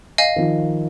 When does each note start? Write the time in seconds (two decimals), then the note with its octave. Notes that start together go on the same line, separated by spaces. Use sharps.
0.18 D#5 F5 G#5
0.36 D#3 F3